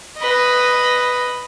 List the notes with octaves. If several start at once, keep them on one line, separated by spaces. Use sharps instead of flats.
B4 D#5